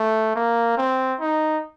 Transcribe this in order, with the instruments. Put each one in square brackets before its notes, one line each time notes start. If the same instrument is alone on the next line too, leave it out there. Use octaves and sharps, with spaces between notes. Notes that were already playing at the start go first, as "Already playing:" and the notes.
Already playing: [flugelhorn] A3
A#3
C4
D#4